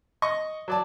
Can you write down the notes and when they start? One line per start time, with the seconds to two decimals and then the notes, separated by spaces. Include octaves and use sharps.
0.22 D#5 C#6 D#6
0.68 F#3 D5 A5